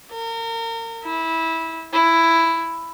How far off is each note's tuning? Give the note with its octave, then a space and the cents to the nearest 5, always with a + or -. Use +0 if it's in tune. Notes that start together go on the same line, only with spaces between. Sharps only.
A#4 -30
E4 -15
E4 +5